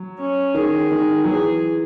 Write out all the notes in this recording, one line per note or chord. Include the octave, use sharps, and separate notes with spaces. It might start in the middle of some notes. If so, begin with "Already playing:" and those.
Already playing: F#3
C#4
D#3 G#4
D#3
F#3
E3 G#4